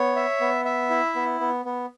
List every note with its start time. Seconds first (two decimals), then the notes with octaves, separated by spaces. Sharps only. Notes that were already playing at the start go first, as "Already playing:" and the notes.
Already playing: B3 C#5
0.16 E5
0.41 B3
0.65 E5
0.90 E4
1.16 B3
1.40 B3
1.65 B3